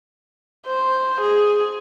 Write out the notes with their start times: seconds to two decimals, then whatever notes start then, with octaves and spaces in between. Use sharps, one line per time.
0.67 C5
1.21 G#4